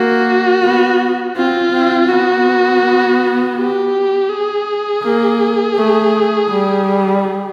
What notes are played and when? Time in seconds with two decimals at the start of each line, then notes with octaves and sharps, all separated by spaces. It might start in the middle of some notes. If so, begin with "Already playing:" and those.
Already playing: A#3 F#4
0.63 B3
1.36 C4 F4
1.72 C4
2.09 B3 F#4
3.56 G4
4.29 G#4
5.04 A#3
5.77 A3
6.50 G3